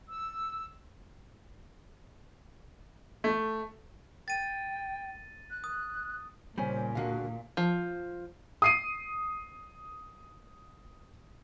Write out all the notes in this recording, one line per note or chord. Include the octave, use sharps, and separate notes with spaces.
E6
A3
G5 A6 D#7
F#6
D#6
A#2 C#3 G3 C#4 C5
C#2 D3 A#3 F#4 F5
F3
D#6 C7 D#7